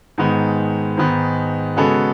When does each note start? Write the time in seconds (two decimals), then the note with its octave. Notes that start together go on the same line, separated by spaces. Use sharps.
0.18 G#2 D#3 G#3 B3
0.97 G#2 D#3 G#3 B3
1.77 C#3 G#3 B3 F#4 A4